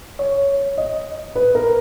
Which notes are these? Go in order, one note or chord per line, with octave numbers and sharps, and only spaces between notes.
C#5
D#5
B4
A#4